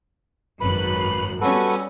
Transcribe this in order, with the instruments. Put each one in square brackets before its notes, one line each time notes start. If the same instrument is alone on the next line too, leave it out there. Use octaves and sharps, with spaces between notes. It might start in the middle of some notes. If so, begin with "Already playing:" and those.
[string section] G#1 F#2 F#6 [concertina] B4 B5
[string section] G3 B3 C#4 [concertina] F#4 A4 B4